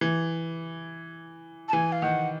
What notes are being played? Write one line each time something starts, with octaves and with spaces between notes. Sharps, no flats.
E3
A5
E3 G#5
F5
D#3 F#5